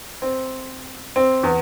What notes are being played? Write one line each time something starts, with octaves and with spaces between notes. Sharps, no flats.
C4
C4
E2